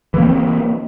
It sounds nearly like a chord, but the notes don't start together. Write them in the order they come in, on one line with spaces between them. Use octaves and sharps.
E3 A#3 C4